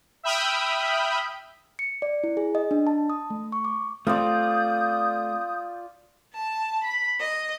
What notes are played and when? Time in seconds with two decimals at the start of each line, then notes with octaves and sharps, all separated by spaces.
0.23 E5 G5 B5 D#6 F6 G6
1.79 C#7
2.02 D5
2.24 E4
2.37 G#4
2.55 D#5
2.71 D4
2.87 A5
3.10 D#6
3.30 A3
3.52 C#6
3.65 D6
4.07 A3 C4 F4 D5 D#6 G6
6.34 A5
6.84 B5
7.20 D#5